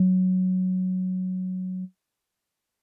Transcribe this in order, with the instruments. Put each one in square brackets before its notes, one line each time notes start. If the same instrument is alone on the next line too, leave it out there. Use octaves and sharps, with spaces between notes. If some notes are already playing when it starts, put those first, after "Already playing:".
Already playing: [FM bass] F#3